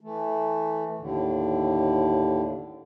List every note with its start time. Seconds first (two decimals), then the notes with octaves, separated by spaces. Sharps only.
0.01 E3 A3
0.98 D#2 A2 D3